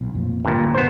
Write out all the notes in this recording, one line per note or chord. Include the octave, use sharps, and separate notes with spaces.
B1
F2 A#2 A3
G#1 D2 G2 A#2
F#1 B1 B3 C5